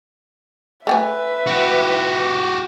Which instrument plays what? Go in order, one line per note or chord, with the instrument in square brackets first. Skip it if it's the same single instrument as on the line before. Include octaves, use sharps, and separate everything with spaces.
[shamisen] A3 G5 G#5 [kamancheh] B4 E5
[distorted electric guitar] F#4 G4